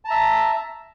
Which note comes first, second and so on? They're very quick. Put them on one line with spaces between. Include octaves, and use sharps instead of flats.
A5 A#5 E5